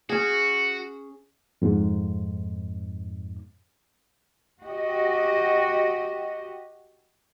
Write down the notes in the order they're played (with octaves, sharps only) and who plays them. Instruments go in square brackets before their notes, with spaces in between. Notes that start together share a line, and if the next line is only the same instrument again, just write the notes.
[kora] C#4 G#4 [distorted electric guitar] F#4
[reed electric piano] F2 G#2
[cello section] F#4 G4 D#5